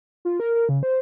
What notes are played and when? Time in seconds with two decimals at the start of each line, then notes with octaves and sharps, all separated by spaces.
0.25 F4
0.40 A#4
0.55 A#4
0.69 C#3
0.83 C5